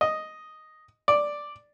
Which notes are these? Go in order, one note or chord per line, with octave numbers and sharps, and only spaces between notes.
D#5
D5